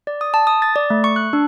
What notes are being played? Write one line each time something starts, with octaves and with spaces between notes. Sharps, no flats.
D5
D#6
A5
D#6
A6
D5
A3
C#6
F#6
D4